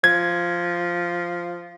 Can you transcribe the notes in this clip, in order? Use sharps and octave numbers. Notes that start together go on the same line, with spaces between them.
F3 G#6